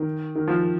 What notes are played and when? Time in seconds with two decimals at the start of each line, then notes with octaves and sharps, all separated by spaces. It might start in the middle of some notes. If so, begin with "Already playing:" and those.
Already playing: D#3
0.35 D#3
0.48 F3